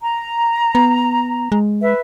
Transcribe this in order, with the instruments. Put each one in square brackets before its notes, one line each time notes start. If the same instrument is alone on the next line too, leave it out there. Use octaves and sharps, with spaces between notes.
[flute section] A#5
[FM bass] B3
G#3
[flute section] B4 E5